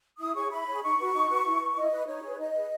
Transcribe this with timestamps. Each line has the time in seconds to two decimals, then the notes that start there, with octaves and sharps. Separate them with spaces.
0.19 E4 D#6
0.35 G#4 C#5 C#6
0.51 E4 B5
0.67 G#4 C#5
0.82 D#4 C#6
0.99 F#4 B4
1.13 D#4
1.29 F#4 B4
1.45 E4
1.60 B4
1.76 E4 D#5
1.92 B4
2.07 D#4 C#5
2.22 G#4 B4
2.38 D#4 D#5
2.53 G#4 B4